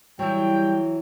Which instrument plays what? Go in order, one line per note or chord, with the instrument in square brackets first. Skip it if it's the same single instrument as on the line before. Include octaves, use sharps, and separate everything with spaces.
[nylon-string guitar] E3 F#3 [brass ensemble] G3 G5